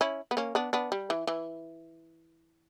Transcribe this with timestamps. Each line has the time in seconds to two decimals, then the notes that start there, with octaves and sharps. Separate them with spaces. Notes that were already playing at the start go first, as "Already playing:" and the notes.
0.01 C#4 E4
0.31 B3
0.37 A#3 C#4
0.55 B3 D4
0.73 B3 D4
0.92 G3
1.10 E3
1.27 E3